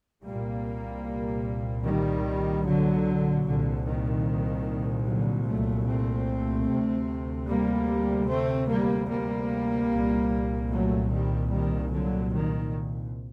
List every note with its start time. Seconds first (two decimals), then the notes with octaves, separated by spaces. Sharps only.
0.24 C2 A#2 G3 A#3
1.85 D#3 G3
2.65 D3 F#3
3.46 C2 A#2 D3
3.87 D#3
5.07 D3 F#3
5.47 F#3 A3
5.87 A3 C4
6.69 D2 C3
7.48 G3 A#3
8.29 A3 C4
8.70 G3 A#3
9.09 G3 A#3
9.91 C2 A#2
10.71 F#3 A3
11.11 D#3 G3
11.51 D#3 G3
11.91 D3 F#3
12.32 D#3